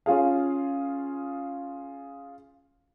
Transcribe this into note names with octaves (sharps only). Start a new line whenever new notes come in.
C#4 F4 G#4 F5